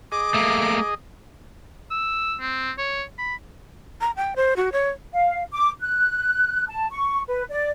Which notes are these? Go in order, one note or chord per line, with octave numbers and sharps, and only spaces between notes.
G#4 D#5 D6
A3 A#3
E6
C4
C#5
B5
A#5
G5
C5
F#4
C#5
F5
D6
F#6
A5
C#6
B4
D5